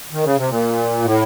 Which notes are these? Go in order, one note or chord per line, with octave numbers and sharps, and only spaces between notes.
D#3
C#3
C3
A#2
A2